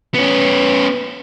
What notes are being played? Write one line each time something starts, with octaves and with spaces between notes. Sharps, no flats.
B3 C#4